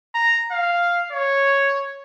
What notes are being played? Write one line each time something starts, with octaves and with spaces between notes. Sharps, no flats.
A#5
F5
C#5